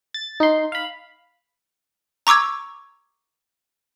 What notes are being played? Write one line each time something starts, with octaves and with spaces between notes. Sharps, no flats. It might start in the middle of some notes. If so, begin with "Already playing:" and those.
A6
D#4 C6
F5 B5
A#5 C#6 D6 E6 G#6